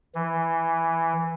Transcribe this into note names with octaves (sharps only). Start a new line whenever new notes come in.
E3